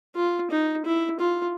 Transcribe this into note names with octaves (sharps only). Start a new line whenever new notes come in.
F4
D#4
E4
F4